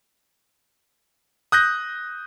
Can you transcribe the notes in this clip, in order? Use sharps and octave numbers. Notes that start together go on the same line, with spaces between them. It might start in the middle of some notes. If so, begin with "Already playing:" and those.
D#6 F#6 G6 A#6